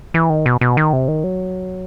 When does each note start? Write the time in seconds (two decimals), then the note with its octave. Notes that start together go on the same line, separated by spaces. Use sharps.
0.14 E3
0.30 D#3
0.46 B2
0.61 B2
0.77 D#3
0.93 C3
1.08 D#3
1.24 F#3